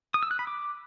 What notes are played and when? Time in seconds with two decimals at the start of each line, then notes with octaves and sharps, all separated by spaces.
0.14 D#6
0.23 E6
0.31 F#6
0.39 B5
0.47 D6